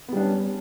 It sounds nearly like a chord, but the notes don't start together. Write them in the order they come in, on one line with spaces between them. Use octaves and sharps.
B3 G3 D4 C#4